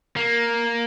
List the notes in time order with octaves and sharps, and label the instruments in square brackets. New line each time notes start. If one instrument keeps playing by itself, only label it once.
[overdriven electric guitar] A#3